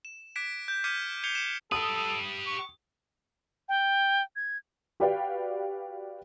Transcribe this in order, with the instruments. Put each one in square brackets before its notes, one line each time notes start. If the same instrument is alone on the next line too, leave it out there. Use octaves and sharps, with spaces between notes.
[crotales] E7
D6 F#6 G#6 B6 D7 E7
G6
D6 F6 G#6 B6 C#7 D#7
G6 G#6 C7 C#7 F7 G7
C#7 E7
[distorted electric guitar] G4 B4 [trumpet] A4 [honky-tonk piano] D#6
[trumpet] C#6
[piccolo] G5
G#6
[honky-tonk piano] F#4 G4 B4 D5 F5 G5